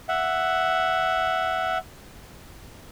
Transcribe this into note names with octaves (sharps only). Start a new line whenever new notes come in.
E5 F#5